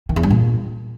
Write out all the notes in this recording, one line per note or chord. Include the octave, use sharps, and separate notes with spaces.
D#3
E2
G2
A#2